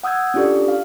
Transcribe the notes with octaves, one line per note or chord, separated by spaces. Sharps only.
F#5 D#6 E6 G6 G#6
C#4 D4 F4 G4 A4 D5
F5